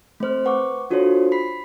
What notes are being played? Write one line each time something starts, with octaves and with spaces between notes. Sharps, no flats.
A3 C4 C5 F6
B4 F#5 C#6 D6
D4 F4 F#4 A4 C5 C#5
B5 B6 C7